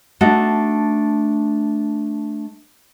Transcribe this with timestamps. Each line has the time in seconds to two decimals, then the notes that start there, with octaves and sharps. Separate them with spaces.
0.21 A3 D4 D#4 F#4